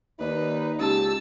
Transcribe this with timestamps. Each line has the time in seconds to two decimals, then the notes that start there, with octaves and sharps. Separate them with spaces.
0.20 D#2 D#4 B4 D5
0.79 C#2 G4 A5 E6